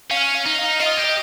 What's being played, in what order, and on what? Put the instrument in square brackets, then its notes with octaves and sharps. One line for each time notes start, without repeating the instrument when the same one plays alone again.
[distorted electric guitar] C#4 [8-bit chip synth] F5
[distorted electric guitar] D#4
[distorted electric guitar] F4 [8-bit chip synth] D#5
[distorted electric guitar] G4